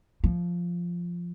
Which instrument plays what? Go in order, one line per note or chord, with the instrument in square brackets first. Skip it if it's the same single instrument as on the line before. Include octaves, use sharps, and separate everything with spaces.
[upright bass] F3